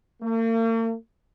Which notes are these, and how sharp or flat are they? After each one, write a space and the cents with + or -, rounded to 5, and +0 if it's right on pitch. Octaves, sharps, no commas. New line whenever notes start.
A#3 -45